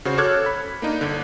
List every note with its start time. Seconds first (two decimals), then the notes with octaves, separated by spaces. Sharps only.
0.05 C#3 F#4 C5
0.18 A4 C#5 D6 F6 F#6 G#6
0.46 B5
0.82 A#3 D4 D#4
1.01 G1 D3